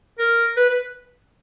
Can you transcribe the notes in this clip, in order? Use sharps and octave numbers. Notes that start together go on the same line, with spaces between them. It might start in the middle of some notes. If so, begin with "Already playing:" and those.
A#4
B4
B4